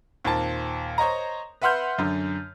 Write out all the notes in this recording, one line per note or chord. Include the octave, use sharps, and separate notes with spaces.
D#2 A#2 C4 A5
C5 C#5 D#5 A#5
B4 E5 F#5 C6 F6 G6
F#2 D3